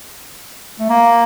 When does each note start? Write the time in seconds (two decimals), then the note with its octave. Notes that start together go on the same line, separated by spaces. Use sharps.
0.79 A3
0.89 A#3